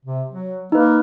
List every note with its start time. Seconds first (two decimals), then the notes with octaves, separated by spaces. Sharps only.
0.05 C3
0.29 F#3
0.72 A#3 D#4 B4